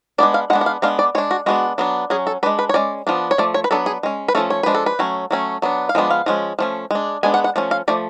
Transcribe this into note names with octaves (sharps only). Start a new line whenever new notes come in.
G#3 B3 D4 D5
F5
G#3 B3 D4 F#5
F#5
F5
G#3 B3 D4 F5
D5
G#3 D4 C#5
F#4
G#3 B3 D4 F#4
F#3 B3 D4
F#3 C#4 G#4
A4
G#3 D4 B4
B4
C#5
G#3 C#4 D5
F3 B3 D4
C#5
F3 A3 D5
C#5
B4
F#3 B3 D4 A4
G#4
G#3 C#4
B4
F3 A3 C#4 A4
C#5
F3 G#3 D4 B4
A4
B4
F#3 A3 C#4
F#3 A3 C#4
F#3 B3 D4
F5
F3 G#3 B3 D4
F5
F3 G#3 C#4
F3 A3 C#4
G#3 D4
G#3 B3 D4 G#5
F#5
F#5
F3 A3 C#4
F5
F3 A3 D5